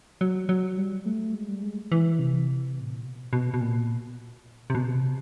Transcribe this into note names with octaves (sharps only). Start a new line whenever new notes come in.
F#3
F#3
G3
A3
G#3
G3
G#3
E3
C3
A2
A#2
B2
B2
B2
A#2
C3
B2
C3